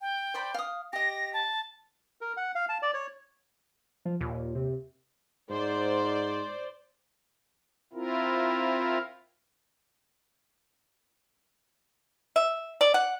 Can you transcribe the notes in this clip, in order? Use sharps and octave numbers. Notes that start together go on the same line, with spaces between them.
G5
C5 D5 B5
F5 D#6
G4 D#5 A#6
A5
A#4
F#5
F5
A5
D5
C#5
F3
D#2 A#2
C3
G#2 C5 D5
C4 E4 F4 A#4
E5
D5
F#5